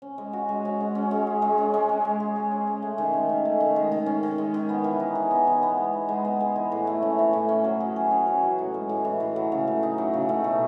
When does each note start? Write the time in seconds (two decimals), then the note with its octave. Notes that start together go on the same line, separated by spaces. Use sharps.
0.02 C#4
0.18 G#3
0.33 F#4
0.49 G#3
0.65 C#4
0.80 G#3
0.95 C#4
1.11 G#3
1.27 G#4
1.42 G#3
1.58 C#4
1.74 G#3
1.89 C#4
2.05 G#3
2.20 G#4
2.36 G#3
2.52 C#4
2.67 G#3
2.82 A3
2.98 D#3
3.13 C#4
3.29 D#3
3.45 A3
3.60 D#3
3.76 G#3
3.92 D#3
4.06 C#4
4.23 D#3
4.38 G#3
4.54 D#3
4.69 B3
4.84 E3
5.00 D#4
5.15 G#4
5.31 B3
5.47 E3
5.63 B3
5.78 G#3
5.94 D#4
6.09 G#3
6.25 B3
6.40 G#3
6.56 E3
6.72 A2
6.87 A3
7.03 C#4
7.19 E3
7.33 A2
7.49 C#4
7.64 F#3
7.80 G#4
7.96 F#3
8.11 C#4
8.27 F#3
8.43 E3
8.59 A2
8.74 G#3
8.89 A2
9.05 E3
9.20 A2
9.36 F#3
9.52 C#3
9.67 A3
9.83 D#4
9.98 F#3
10.14 C#3
10.29 A3
10.44 B2